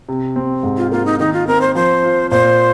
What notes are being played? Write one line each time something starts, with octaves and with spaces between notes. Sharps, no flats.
C3
C4
G#2
F4
A#3 F4
D#4
D#3 D#4
F4
C4 A#4
C5
F3 C5
F4
A#2 C5